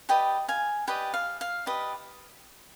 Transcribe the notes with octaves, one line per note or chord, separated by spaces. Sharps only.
G4 B4 D5 D#5 G5
F5 G#5
G4 B4 D5 D#5 G5
F5
F5
G4 B4 D5 D#5